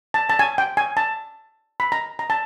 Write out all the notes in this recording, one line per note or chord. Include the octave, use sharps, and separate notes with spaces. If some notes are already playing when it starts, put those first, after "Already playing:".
A5
A5
G#5
G5
G#5
A5
B5
A#5
A#5
A5